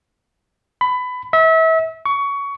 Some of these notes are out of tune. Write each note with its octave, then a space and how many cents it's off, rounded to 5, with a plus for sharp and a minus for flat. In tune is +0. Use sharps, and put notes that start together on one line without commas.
B5 +20
E5 -30
C#6 +20